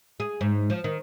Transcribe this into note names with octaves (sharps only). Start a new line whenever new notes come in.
G#4
G#2
F3
D#3